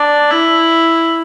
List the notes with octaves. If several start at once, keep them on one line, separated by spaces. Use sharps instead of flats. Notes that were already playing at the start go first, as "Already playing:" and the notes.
Already playing: D4
E4